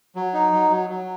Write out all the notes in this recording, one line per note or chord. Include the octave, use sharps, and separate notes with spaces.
F#3
D#4
F#3
F#3
F#3